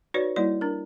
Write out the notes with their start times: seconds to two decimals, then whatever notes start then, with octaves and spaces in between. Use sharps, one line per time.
0.14 D#4 F#4 B4 C#5 D5
0.36 G3 A#3 E4 D5
0.61 D4 A#4